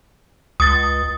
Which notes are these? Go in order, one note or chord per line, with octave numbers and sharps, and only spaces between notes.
C#2 D#6 A6